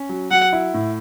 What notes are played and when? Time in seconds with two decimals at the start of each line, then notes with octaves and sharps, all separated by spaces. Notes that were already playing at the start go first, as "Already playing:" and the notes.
Already playing: C#4
0.09 F#3
0.31 F#3 F#5
0.53 E4
0.74 A2